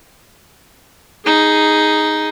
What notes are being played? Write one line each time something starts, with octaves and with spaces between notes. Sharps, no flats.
D#4 G#4